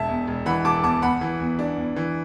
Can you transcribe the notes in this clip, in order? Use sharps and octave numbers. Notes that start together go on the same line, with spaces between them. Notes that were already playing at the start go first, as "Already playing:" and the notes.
Already playing: E1 E5 A5
E2
E1
E3 F#5 B5
E1 A5 D6
E2 A5 D6
E2 F#5 B5
E3
E2
D4
E2
E3